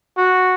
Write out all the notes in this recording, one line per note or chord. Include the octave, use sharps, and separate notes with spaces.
F#4